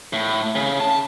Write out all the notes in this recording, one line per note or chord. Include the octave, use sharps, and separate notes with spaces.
A2
C#3
A5